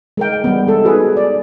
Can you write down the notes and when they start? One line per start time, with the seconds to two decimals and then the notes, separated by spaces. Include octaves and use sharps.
0.17 G#3 A#4 G5
0.44 G3 B3
0.67 G#3 A4
0.84 D#4 F#4 G#4 B4
1.17 D5